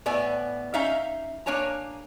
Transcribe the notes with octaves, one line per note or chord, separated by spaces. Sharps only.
A2 B3 D5 G#5
C#4 D#4 E5 F5
A#3 D4 C#5 G#5 A#5